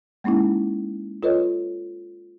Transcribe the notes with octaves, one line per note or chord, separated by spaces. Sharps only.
G#3 A#3 C#4 D#4 E4
F4 A4 B4 C#5 D#5